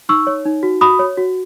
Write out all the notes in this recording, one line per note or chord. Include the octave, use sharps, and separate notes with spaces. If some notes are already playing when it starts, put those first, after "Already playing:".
D#4 C#6 E6
C#5
D#4
F#4
F#4 B5 D#6
C#5
F#4